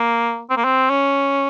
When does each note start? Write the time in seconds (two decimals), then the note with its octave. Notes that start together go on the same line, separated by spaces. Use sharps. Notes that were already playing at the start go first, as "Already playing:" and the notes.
Already playing: A#3
0.50 C4
0.56 A#3
0.64 C4
0.90 C#4